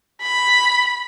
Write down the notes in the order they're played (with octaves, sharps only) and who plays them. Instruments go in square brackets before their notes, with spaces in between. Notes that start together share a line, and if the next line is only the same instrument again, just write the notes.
[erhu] B5